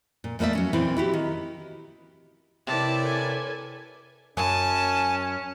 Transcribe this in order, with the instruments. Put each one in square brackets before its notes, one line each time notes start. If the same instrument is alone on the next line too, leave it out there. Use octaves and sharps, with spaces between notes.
[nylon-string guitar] A#2
E2 A3 A#3 B4 D5 E5
F#3 C#4
A#2 E3 C4 E4
E4 F#4 G4
D#3
[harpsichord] C3 [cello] E4 D5 [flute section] A#4 B4 C#5 [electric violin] A5
[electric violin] A4 G#5
[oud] F#2 [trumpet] C#4 [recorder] G#5 [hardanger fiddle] A5